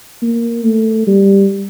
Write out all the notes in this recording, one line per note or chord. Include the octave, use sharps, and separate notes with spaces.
A#3
A3
G3